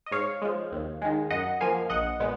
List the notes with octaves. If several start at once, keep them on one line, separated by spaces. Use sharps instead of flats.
D#5
G#2 C#5 F5
F3 G#3
D#2
D#3 G#3
F#2 D#5 F#5
F3 A#3 F5 G#5
A#1 D#5 F#5
A#2 G#3 B3